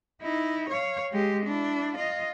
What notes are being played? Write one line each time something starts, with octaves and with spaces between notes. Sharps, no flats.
D#4 E4
C#5 F5
G#3 G4
D4 E4
F4 D#5